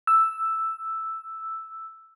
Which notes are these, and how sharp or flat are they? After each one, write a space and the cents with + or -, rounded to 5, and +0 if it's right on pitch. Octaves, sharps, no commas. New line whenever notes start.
E6 +0